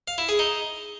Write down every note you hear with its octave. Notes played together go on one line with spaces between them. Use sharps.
F5
E4
G#4
D#4